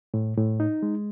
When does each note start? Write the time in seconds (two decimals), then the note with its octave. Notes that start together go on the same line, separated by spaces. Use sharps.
0.14 A2
0.37 A2
0.60 D#4
0.82 G#3